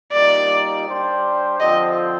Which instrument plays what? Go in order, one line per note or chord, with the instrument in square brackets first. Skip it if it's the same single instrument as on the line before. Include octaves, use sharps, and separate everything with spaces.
[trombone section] A#2 G3 A#3 D#4 [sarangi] D5
[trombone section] G3 D4 G4 C5
[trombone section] D3 F3 C4 [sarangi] D#5